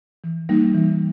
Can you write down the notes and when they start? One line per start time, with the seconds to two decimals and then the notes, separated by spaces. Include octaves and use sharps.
0.24 E3
0.49 G3 A#3 D#4
0.75 E3